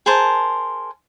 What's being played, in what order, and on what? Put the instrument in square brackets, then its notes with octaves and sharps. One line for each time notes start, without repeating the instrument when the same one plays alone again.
[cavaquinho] G#4 A#4 C5 A5